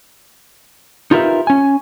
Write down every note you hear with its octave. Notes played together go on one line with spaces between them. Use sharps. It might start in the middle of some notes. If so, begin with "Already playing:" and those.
D#4 F4 G4 A#4 B4 E5
C#4 G#5